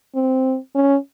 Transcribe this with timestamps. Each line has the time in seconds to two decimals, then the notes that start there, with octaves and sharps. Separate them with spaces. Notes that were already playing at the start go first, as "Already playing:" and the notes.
0.15 C4
0.75 C#4